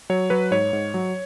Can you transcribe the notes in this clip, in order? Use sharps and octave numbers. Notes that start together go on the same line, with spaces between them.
F#3 C#5
F#3 B4
G#2 C#5
G#2
F#3